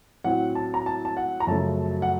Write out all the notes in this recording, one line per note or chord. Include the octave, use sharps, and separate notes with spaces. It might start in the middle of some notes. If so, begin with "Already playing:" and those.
A2 F#3 C4 F#5
A5
A#5
A5
A5
F#5
A#5
F#2 C#3 F3 A3 C#4 A5
F#5